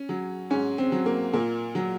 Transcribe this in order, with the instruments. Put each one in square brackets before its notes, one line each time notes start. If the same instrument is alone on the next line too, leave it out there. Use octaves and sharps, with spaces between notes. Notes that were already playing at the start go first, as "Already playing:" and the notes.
Already playing: [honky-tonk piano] C#4
F#3
G#2 C#4
C4
F#3
A#3
A#2 A#3
F#3